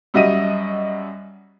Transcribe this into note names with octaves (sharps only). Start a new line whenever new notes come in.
F#2 G3 F#4 D#5 E5 D#7